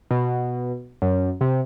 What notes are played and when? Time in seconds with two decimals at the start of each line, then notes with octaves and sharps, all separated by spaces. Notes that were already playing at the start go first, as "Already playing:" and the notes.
0.11 B2
1.02 F#2
1.41 C3